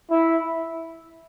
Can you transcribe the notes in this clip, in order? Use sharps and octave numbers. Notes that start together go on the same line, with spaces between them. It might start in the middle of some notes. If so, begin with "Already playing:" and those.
E4